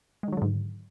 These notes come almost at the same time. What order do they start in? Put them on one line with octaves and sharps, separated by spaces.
G#3 D#3 F#3 D3 G#2